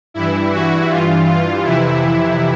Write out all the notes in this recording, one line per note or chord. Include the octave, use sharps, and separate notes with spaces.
G2 E3 E4
F#4
G2 E3 F4
F4
F2 C3 E3 E4